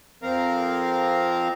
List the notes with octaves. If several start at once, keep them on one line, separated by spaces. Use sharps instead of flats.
F2 F3 C4 A#4 F5 A#5